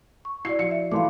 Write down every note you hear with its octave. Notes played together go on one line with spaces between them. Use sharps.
C#6
E4 F#4 D5 C7
F3 F#4 C#7
E5
E3 A3 F5 C6 D6